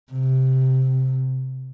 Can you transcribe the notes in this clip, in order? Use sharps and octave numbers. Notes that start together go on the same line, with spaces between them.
C3